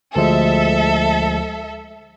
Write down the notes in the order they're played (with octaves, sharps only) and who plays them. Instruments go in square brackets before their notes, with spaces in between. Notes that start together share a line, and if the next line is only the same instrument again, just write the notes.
[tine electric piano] D2 F3 G#3 [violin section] A4 E5